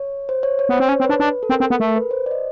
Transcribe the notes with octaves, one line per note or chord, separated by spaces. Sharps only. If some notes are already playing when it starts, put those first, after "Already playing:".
Already playing: C#5
C5
C#5
C#5
B3 C5
C4
C#4 C#5
C4
D4 B4
D4
A4
C4 A#4
C4
A4
B3
A3 A#4
B4
C5
D5
D#5